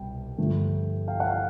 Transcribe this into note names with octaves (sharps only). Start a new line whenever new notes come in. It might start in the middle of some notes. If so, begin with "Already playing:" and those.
Already playing: C2 B2 G5
G2 D3 F3 A3
F5 G5
F#5
F5 G5